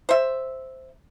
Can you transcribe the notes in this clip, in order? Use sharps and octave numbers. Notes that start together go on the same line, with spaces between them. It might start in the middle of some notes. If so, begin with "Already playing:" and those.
C5 E5